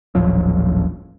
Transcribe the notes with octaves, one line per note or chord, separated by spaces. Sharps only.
D#1 A1 F3 F#3